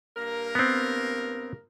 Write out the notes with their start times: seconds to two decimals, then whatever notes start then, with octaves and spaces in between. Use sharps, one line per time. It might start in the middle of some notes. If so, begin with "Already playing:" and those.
0.16 G2 A#3 A#4
0.55 B3 C4